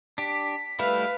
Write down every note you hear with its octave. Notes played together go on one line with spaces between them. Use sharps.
D4 G4 B6
G3 A3 E4 B4 F5